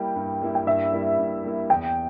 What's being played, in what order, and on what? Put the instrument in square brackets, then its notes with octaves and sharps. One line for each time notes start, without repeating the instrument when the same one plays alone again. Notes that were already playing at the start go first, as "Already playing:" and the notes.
Already playing: [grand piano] G3 A#3 E4 [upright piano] G5
[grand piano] G2
G3 A#3 E4
[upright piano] G5
[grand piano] G2 [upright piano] E5
[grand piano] G3 A#3 E4
G2
G3 A#3 E4
[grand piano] E2 [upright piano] G5